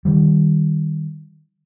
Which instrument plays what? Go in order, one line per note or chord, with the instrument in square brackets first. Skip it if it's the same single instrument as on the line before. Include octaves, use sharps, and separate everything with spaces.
[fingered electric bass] D#3 G3